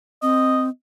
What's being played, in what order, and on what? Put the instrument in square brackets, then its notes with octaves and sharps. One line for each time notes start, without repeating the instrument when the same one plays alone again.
[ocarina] C4 [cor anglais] D#5